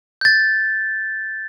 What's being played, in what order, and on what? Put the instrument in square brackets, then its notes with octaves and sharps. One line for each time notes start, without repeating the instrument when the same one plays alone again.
[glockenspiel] G6 A6